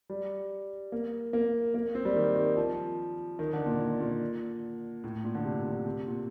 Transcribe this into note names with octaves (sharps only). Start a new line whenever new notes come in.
G3
A#3
A#3
A#3
C4
G3
D#3
D#3
F3
D#3
D3
A#2
A#2
A#2
A2
A#2
D3
C3
C3
D3
C3
A#2